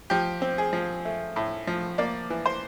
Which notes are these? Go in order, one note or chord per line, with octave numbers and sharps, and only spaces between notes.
F3 G4
C4
G#4
F3
A3
A2
F3
A#3 D5
E3
C5